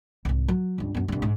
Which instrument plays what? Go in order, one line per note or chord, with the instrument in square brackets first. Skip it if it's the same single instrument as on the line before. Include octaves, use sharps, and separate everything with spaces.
[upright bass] C2 G#2
F#3
C#2 G2
F#2 B3
C2 G2
G#2